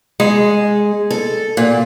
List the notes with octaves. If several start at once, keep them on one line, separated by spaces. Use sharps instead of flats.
G#3
A4
A#2